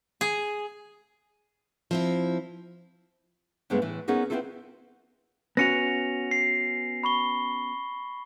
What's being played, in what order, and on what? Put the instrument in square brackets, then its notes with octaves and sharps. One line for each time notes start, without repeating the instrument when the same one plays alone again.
[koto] G#4
[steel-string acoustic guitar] F3 C4 E4
[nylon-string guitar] G2 C#3 G#3 A3 B3
A2 E3
B3 C#4 D#4 G#4 A#4
B3 C4 D4 E4 F4 A4
[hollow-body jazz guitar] B3 C#4 F#4 [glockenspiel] A#6 C#7 F7
[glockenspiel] C7
B5 C#6 G7